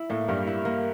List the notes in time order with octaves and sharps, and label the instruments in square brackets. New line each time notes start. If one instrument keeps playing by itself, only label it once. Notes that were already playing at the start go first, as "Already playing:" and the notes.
Already playing: [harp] E4
[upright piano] A2 A3 [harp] A#3
[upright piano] G2 G3 [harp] A#3
[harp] E4
A#3